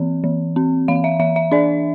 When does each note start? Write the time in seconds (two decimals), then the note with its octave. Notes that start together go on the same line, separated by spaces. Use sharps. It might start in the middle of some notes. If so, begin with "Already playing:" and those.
Already playing: E3 C4
0.24 E3
0.56 C4
0.88 E3 F5
1.04 E5
1.20 E3 E5
1.36 E5
1.52 D4 D5